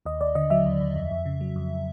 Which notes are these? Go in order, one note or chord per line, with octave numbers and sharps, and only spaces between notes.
D#2 D#5
D#2 D5
D3 D#5
F#3 E5
D#2
D#2
F2
F2
C#3
F#3
F2